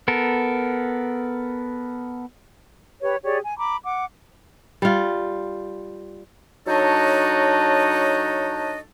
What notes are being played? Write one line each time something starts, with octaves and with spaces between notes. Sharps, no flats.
B3 A4 A#4
G4 B4 C#5
G4 G#4 C#5 D5
G#5
A#5 B5 D6
F#5 D6
G3 F4
F#3 D4 D#4 A4 C#5 D#5